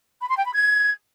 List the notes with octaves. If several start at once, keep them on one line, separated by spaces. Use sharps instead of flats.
B5
C6
G5
B5
G#6